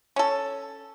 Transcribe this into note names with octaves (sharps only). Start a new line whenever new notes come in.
C#4 A4